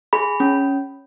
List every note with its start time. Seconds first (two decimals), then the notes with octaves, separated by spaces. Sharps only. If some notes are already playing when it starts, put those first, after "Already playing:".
0.13 G#4 B5
0.40 C#4